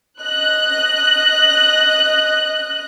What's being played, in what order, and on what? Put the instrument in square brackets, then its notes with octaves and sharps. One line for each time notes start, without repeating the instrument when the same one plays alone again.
[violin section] D#5 F#6